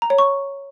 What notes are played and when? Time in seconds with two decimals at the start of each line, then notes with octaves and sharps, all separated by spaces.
0.02 A#5
0.10 C#5
0.19 C#6